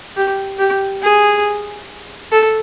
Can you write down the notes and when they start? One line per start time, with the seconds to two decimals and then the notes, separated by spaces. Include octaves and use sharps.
0.16 G4
0.59 G4
1.02 G#4
2.32 A4